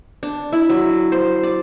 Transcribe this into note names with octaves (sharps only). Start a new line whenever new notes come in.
D4
E4
F#3
C5
D5